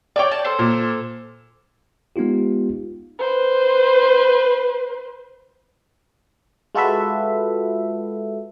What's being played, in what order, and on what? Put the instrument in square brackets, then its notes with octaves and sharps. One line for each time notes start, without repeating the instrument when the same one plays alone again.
[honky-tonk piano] C#5 D5 [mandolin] G5 G#5 D6
[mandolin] A5
A4 C5
[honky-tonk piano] A#2
[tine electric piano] G#3 B3 D#4 F4 G4
[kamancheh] B4 C5
[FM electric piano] G#3 F4 F#4 A4 B4 E5